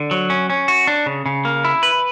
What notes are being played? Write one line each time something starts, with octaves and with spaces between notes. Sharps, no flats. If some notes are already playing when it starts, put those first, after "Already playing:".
Already playing: D3
F#3
C#4
C#4
F#4
D4
C#3
C#3
A#3
E4
B4